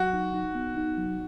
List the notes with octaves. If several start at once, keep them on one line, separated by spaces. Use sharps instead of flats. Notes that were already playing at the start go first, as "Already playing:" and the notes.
Already playing: F#3 F#4
D#4
D#4
B3
D#4
F#3